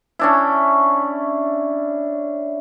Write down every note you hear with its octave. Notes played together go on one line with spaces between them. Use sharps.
C#4 D4 E4